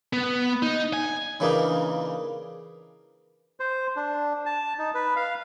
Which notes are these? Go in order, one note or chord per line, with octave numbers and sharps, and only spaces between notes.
B3
D#4
G#5
C#3 E3 A#3 D4 D#4
C5
D4
A5
D#4
B4
F5